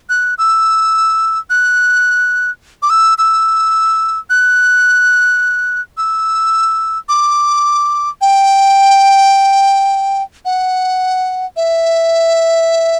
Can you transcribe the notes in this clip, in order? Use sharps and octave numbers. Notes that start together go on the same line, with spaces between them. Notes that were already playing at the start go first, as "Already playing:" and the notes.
F#6
E6
F#6
D6
E6
E6
F#6
E6
D6
G5
F#5
E5